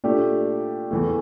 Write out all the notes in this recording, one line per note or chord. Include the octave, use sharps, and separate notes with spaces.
A#2 A3 D4 G4
E2 E3 A3